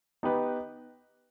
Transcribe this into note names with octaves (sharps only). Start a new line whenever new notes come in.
B3 D#4 G4 B4